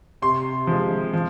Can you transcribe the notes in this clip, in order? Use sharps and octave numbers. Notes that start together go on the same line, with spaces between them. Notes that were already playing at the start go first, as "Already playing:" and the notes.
C3 C6
F3 G#3
F3